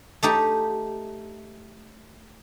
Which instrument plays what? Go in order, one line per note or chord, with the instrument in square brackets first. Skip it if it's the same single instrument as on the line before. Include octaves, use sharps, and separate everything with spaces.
[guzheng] A3 D#4 G4